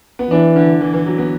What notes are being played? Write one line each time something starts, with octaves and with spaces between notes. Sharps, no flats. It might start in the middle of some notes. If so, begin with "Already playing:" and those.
B3
E3 D4
D3
E3
E3
F#3
B3